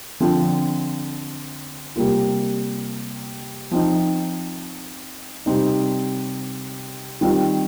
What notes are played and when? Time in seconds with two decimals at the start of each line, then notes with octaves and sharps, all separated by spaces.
0.20 D3 F3 C4 F4
1.96 C3 G3 A#3 F4
3.71 F3 C4 D#4
5.46 C3 G3 C4 D#4
7.21 D#3 G3 C4 F4